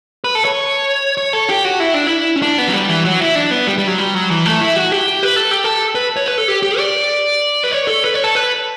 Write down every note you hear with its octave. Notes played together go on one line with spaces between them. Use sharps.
B4
A4
C#5
C#5
A4
G4
F#4
E4
D4
E4
C#4
D4
B3
F#3
G3
E3
F#3
E4
D4
B3
G3
G3
F#3
G3
F#3
E3
A3
E4
F#4
G4
B4
A4
G4
A4
B4
C#5
B4
A4
G4
G4
D5
B4
C#5
A4
B4
C#5
A4
B4